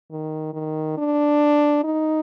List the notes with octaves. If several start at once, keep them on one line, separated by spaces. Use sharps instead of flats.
D#3
D#3
D4
D#4